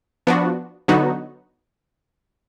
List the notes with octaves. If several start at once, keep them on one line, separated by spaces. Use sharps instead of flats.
F3 B3 D4 F#4
D3 F#3 B3 D#4 F#4